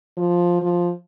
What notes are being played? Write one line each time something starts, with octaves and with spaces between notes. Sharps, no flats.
F3
F3